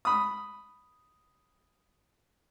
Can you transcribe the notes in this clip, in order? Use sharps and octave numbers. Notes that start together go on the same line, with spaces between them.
B5 D#6